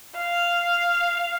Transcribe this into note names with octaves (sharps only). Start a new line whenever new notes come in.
F5